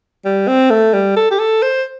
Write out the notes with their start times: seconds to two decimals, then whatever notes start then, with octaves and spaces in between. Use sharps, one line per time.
0.25 G3
0.48 C4
0.70 A3
0.94 G3
1.17 A4
1.31 G4
1.39 A4
1.63 C5